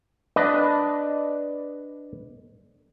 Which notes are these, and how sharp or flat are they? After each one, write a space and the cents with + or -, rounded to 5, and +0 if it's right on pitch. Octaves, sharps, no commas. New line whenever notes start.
D4 +0 B4 +5 D#5 +0